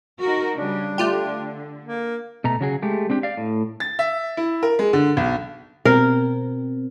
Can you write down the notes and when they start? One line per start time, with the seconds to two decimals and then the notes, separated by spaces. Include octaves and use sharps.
0.21 D#4 F#4 A#4
0.57 C#3 G3 D4
0.98 D3 A3 F4 G4
1.85 A#3
2.44 B2 A3 A#5
2.61 C#3 F#3 G#4
2.82 G#3 A3 G4
3.10 C4 D4 G4
3.23 D5 F5
3.37 A2
3.80 A6
3.99 E5
4.37 E4
4.63 A#4
4.79 G#3
4.93 D3
5.17 B1
5.85 B2 C4 A#4